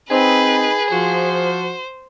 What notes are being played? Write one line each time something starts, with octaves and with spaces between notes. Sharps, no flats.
C4 D#4 G#4 B4
F3 F#4 C5